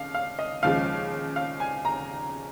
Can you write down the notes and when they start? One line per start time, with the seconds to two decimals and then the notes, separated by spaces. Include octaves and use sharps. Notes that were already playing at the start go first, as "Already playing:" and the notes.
Already playing: D#2 C#3 F5
0.14 F5
0.39 D#5
0.63 D#2 C#3 F3 G#3 F5
1.36 F5
1.60 G#5
1.85 A#5